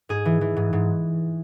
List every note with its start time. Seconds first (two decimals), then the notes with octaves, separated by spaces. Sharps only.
0.09 G#2 G#4
0.25 E3
0.41 E3
0.56 G#2
0.73 G#2